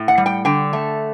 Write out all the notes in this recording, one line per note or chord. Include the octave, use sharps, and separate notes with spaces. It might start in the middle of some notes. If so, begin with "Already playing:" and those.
Already playing: A2
F#5
G3
G5
D3 G5
A3